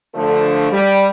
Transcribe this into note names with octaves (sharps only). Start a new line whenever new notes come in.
D3 F3 A3
G3